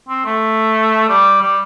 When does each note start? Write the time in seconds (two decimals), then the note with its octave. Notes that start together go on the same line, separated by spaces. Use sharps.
0.09 C4
0.26 A3
1.09 G3
1.42 G3